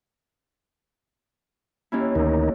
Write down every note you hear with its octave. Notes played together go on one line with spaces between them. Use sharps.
D#2 C#4 E4
D2 D#3 D#4